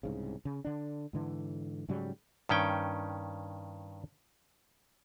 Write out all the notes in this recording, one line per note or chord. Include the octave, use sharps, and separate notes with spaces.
C2 G#2 C#3
C#3
D3 D4
G#2 D3 E3
G#2 C#3 F#3 G3
G2 D#3 C#4 G5